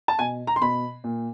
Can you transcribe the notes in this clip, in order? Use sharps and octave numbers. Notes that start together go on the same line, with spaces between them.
A5
B2 G#5
A#5
C6
B2 B5
A#2